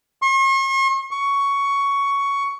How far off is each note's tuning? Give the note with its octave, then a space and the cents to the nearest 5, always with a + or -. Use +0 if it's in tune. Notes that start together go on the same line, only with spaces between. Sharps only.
C#6 -45
C#6 +10